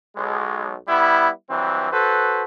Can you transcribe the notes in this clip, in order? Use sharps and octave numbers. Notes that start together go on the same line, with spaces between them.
B1 G#3
G3 B3 E4
G2 E3 F#3 C4
F#4 A4 B4 C5